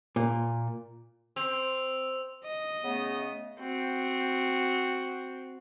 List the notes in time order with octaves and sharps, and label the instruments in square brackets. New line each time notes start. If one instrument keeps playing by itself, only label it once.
[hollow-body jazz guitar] A#2
[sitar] C4 [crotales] E6 F7
[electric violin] D#5
[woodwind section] C#3 A3 B3
[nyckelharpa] C4 F#4